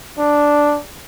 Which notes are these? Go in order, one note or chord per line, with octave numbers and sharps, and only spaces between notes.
D4